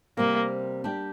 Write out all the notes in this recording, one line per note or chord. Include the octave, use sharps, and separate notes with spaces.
C3 G3 A#3 C4
G3 D4 G4